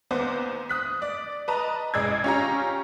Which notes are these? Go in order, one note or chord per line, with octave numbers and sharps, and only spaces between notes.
D#2 B3 C5 D6
D#6 F#6 B6
D5
B4 D#5 A5 A#5
A1 G#3 D5 E6 G#6
C#4 F4 G4 A#5